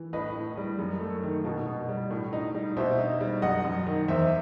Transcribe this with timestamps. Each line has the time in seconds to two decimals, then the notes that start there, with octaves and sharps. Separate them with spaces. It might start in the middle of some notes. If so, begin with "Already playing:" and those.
Already playing: E3
0.13 A2 B4 D#5
0.35 A2
0.57 G3
0.79 F#2
1.01 A3
1.23 D#3
1.45 B2
1.66 B2
1.89 G3
2.11 A2
2.33 D#4
2.54 G3
2.77 B2 C5 E5
2.98 D#4
3.20 G3
3.42 F#2 D#5 F#5
3.65 F#2
3.87 D#3
4.08 E2 C5 E5